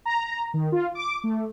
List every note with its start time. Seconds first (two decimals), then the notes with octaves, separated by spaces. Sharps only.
0.06 A#5
0.54 D#3
0.72 F4
0.95 D6
1.24 A3